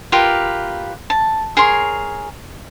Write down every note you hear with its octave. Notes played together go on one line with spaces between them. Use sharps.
F4 G4 A#4 B4
A5
G#4 A#4 C#5 C6